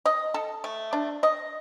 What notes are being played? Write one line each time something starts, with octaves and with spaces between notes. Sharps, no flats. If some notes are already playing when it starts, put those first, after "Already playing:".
D#5
A4
A3
D4
D#5